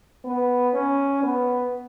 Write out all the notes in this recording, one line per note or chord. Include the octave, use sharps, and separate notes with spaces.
B3
C#4
B3